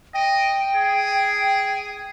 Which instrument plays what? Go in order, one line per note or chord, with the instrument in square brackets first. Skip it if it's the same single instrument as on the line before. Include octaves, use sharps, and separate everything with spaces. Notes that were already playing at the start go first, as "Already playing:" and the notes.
[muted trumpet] D#5 [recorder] G5
[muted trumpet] G#4